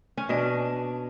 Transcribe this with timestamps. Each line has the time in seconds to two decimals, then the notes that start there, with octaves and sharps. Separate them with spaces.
0.17 C#4
0.29 B2 D4